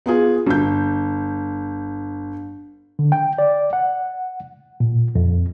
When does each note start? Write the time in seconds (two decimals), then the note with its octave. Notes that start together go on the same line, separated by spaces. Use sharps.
0.06 B3 F4 G#4
0.46 G1 G6
2.99 D3
3.12 G5
3.38 D5
3.73 F#5
4.80 A#2
5.15 F2